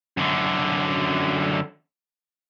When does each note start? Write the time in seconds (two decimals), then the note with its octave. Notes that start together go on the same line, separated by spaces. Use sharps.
0.17 F#2 D3